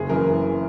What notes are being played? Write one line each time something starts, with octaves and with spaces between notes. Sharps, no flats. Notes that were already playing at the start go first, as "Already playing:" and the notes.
Already playing: F#1 G#4
F#2 E3 A#4